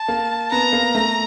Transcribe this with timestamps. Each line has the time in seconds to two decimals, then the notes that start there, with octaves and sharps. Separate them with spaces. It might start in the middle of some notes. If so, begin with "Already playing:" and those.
Already playing: A5
0.08 A#3
0.51 B3 A#5
0.73 A#3
0.95 A3